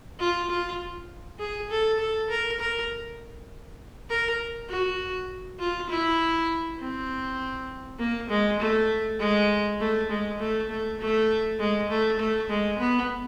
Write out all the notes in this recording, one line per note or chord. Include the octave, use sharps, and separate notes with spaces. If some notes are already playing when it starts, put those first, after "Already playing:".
F4
F4
G#4
A4
A4
A#4
A#4
A#4
F#4
F4
E4
C4
A#3
G#3
A3
G#3
A3
G#3
A3
A3
A3
G#3
A3
A3
G#3
B3